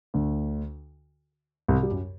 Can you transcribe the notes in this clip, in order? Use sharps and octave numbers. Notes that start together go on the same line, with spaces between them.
D2 D3
C2 C3
G3
F#2 F#3